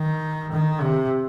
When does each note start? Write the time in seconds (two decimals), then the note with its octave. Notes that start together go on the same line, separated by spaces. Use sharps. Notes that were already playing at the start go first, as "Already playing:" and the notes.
Already playing: D#3
0.52 D#3
0.81 C3